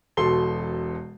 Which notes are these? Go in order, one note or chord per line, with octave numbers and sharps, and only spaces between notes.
E1 B2 A4 C6 C7 G7